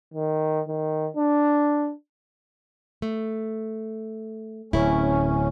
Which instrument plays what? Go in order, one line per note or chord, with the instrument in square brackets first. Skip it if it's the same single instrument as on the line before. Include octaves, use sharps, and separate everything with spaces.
[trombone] D#3
D#3
D4
[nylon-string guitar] A3
[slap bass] D1 [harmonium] C#4 [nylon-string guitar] E4